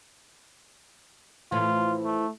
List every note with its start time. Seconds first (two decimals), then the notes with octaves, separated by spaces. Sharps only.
1.52 A2 E3 F3 F4
2.04 A3